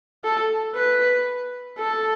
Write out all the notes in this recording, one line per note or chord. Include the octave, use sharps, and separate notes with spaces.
A4
B4
A4